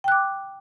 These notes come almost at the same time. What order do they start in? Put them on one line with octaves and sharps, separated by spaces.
G5 F#6 D6